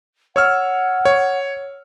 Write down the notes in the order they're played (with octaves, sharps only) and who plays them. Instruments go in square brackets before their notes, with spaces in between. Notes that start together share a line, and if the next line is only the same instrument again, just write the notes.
[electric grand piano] C#5 E6 F6 [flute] F#5
[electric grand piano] C#5